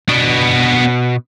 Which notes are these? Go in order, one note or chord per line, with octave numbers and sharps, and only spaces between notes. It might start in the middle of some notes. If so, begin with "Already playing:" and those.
B2 B3 D4